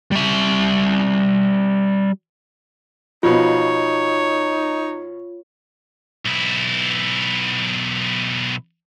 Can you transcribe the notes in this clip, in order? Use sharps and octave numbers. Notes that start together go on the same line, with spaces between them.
G3 E5
B2 F3 D#4 F4 C#5
B1 E4